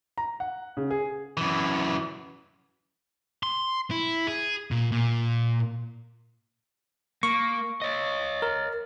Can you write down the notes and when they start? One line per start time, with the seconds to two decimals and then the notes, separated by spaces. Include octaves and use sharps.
0.18 A#5
0.40 F#5
0.77 C#3
0.91 G#4
1.37 F#2 E3
3.43 C6
3.91 E4
4.27 G#4
4.71 A#2
4.92 A#2
7.23 A#3 C#6
7.82 C#5 D#5
8.42 A#4